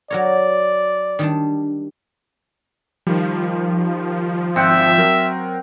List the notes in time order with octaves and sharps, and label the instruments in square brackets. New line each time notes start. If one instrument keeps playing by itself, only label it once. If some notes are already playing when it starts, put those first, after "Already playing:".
[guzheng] F#3 A#4 C#5 [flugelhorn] D5
[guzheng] D#3 G3 D4
[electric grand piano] D#3 G3 [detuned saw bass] F3
[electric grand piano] G#1 [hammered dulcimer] C4 F#5 G5 [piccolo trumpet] E5
[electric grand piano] F#3 A#4